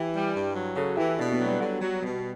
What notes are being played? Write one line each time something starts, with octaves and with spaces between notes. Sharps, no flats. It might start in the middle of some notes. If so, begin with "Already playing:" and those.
Already playing: E3 E4 G4
G3
G2
F#3
C#3 F#4 A4
E3 E4 G4
B2 D4 F#4
B3 D4
F#3
G3 B3
D3
F#3
B2